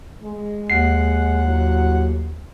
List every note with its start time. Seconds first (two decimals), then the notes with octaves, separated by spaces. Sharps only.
0.22 G#3
0.70 D#2 F#5 C7
1.42 A2 D3 F#3